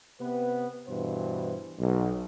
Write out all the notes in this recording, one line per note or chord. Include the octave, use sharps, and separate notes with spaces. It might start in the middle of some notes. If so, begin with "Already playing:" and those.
C3 B3 B4
G2 B2 E3 C5
B1